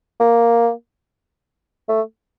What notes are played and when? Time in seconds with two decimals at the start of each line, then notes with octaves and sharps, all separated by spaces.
0.20 A#3
1.89 A3